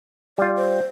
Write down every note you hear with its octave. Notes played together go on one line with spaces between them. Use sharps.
G3 F4 D5
C5